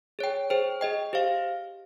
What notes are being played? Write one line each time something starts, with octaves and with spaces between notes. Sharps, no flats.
G#4 C#5 G5
G#4 C5 G5
G#4 D#5 G5
G4 C5 F5